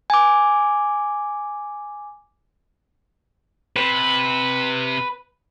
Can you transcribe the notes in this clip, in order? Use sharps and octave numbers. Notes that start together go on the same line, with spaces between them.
G#5 D6
C3 B4